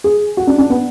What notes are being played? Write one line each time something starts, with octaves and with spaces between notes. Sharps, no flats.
G#4
F#4
D4
D4
B3